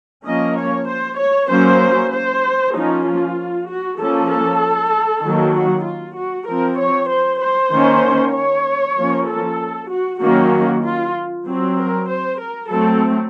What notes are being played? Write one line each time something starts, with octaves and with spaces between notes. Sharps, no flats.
F3 A#3 C#4 D#5
C#5
C5
C#5
F#3 A#3 C#4 C5
C5
F3 A#3 C#4 D#4
F4
F#4
F3 A#3 C#4 A4
A4
D#3 F#3 A#3
F#4
F4
F#4
F3 C4 A#4
C#5
C5
C5
D#3 A#3 C#4
C#5
F3 A#3 C#4
A4
F#4
D#3 F#3 A#3 C#4 F#4
F4
F#3 C4
A#4
C5
A#4
F#3 A3 C4 A4